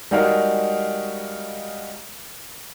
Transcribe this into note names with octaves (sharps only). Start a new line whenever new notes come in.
G3 G#3 D#4 F#4 A#4 F5